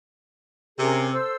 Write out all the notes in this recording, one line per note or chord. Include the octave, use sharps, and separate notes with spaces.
C3 C#4 G#4 A#4
A4 C5 E6